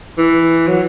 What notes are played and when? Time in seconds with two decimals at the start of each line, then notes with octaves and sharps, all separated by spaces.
0.18 E3
0.68 F#3